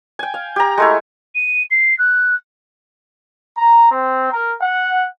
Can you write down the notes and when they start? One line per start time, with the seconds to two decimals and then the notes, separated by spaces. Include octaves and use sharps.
0.19 G5 G#5
0.34 F5
0.56 G4 A#5
0.77 G#3 A3 E4
1.35 D#7
1.70 C7
1.98 F#6
3.57 A#5
3.91 C4
4.32 A#4
4.62 F#5